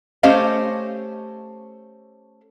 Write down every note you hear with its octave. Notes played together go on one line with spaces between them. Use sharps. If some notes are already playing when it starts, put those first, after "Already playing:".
A3 C#4 G4 C5 D#5 F5